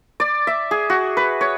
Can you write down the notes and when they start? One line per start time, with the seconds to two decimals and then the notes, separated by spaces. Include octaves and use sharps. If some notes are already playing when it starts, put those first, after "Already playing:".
0.20 D5
0.47 E5
0.71 G#4
0.90 F#4
1.17 B4
1.41 C#5